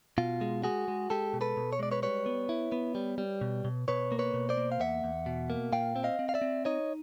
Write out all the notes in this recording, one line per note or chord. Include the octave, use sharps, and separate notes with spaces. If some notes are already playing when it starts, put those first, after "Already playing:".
B2 F4
G#3
G#3 F#4 G#4
G#3
G#3 G4 A4
B2
A4 B4
B2
C#5
G#3 D5
B4 C#5
G3 B4 C#5
B3
E4
B3
G3
G3
B2
B2
B2 B4 C#5
A#3
B4 C#5
B2
C5 D5
A#3
F5
E2 E5 F#5
E2
B2
A#3
A#2 F5 G5
C4
D#5 F5
C4
F5
D5 E5
C4
D#4 C#5 D#5